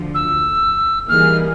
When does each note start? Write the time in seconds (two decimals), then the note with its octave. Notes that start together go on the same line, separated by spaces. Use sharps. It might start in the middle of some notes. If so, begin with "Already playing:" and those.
Already playing: D2 D3 F3
0.14 E6
1.08 E3 G3 A#3 D#4 G#4 F6